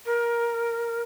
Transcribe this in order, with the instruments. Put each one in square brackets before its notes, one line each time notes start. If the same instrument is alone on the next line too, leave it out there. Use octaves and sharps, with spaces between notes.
[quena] A#4